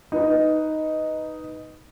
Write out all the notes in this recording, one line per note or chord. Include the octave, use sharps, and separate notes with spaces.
D#4 B4